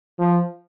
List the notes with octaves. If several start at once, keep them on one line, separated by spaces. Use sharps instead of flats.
F3